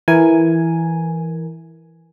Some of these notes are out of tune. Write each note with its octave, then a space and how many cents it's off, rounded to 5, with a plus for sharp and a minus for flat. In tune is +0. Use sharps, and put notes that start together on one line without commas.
E3 +0 A#4 +0 G#5 +0